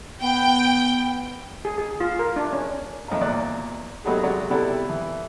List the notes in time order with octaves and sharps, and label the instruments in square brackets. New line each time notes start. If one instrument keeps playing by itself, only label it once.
[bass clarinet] B3 [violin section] G5
[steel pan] G#4
G#4
F4
A#4
D4
C#4
[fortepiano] F2 A2 C#5 D#5 F5 A#5
E2 A#2 D5 F#6
F#3 G3 A3 B3 D#4 G#4
C3 F#3 G#3 D5
C3 G3 B3 E4 A4 D5
E3